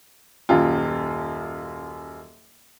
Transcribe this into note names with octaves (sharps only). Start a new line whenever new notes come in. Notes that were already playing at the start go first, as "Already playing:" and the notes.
D#1 F#2 F4